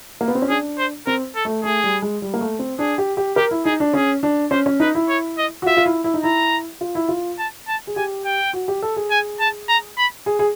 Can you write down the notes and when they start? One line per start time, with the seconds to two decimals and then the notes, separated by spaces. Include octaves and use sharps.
0.21 A#3
0.28 B3
0.35 C4
0.42 C#4
0.49 D4 G#4
0.78 C5
1.07 C4 A#4
1.36 A4
1.45 A3
1.64 A3 G#4
1.84 G3
2.02 G#3
2.22 G3
2.34 A#3
2.41 A3
2.59 C4
2.79 D4 G#4
2.98 G4
3.17 G4
3.36 G4 A#4
3.51 E4
3.65 D#4 G#4
3.80 D4
3.94 C#4 G#4
4.23 D4
4.51 C#4 C5
4.66 C#4
4.80 D#4 B4
4.95 E4
5.09 C#5
5.38 D#5
5.62 F#4
5.66 F4 E5
5.77 F4
5.86 E4
6.04 E4
6.14 D#4
6.23 E4 A#5
6.81 F4
6.95 E4
7.08 F4
7.39 A5
7.68 A5
7.87 G#4
7.96 G4 G#5
8.25 G5
8.53 F#4
8.68 G4
8.82 A4
8.96 G#4
9.11 G#5
9.40 A5
9.69 A#5
9.97 B5
10.26 G#4
10.39 G#4